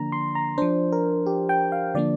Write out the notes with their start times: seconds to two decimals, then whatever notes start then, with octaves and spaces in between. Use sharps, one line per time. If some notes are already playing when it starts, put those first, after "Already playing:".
Already playing: D3 F3 A#3 D4 A#5
0.12 C6
0.35 A#5
0.58 F3 D4 C5
0.92 A#4
1.26 G4
1.49 G5
1.72 F5
1.94 D3 F3 A#3 D4 D5